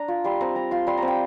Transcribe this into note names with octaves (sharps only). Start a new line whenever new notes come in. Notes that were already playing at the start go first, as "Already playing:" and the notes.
Already playing: D4 A#5
F4
G3 C6
C4 A#5
G3 A#5
F4 C6
G3 C6
C4 A#5
G5